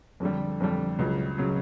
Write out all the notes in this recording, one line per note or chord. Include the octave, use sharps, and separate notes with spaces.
F2 D3 G3
F2 D3 G3
C#2 C#3 F#3
C#3 F#3